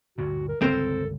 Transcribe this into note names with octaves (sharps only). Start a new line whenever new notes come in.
D2 G2 A#2 F#4
A#4
G1 C#2 C4 A4 A#4 C5